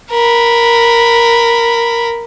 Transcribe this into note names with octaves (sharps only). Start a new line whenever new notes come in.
A#4 B5